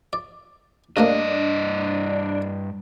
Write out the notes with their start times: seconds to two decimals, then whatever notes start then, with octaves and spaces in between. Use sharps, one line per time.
0.13 D5
0.97 G2 C3 A3 A#3 D4 D#5